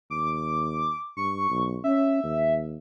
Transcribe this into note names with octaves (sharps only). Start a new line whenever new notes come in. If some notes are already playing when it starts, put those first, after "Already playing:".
D#2 D6
G2 C#6
B1
C#4 E5
D#2